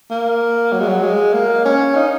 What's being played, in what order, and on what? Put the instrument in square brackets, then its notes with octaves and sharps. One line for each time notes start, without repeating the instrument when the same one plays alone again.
[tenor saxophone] A#3
F#3
G#3
F#3
G#3
A#3
C#4
D#4